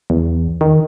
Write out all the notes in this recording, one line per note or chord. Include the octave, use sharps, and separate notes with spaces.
E2
D#3